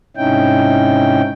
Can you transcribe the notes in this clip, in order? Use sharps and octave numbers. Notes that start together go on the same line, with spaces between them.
G#2 C3 C#4 D#4 E4 G5